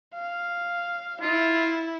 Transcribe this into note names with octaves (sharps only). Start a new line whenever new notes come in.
F5
E4 F4